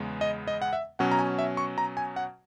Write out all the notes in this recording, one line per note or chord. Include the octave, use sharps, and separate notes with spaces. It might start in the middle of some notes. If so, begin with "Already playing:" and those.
Already playing: E2 C#3 G#3 B3
D#5
D#5
F#5
E5
B2 F#3 C#4 F#5
A#5
G#5
E5
C#6
A#5
G#5
F#5